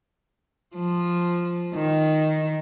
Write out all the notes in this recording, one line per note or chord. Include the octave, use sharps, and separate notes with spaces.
F3
D#3